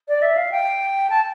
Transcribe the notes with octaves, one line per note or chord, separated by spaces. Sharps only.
D5
E5
F5
G5
A5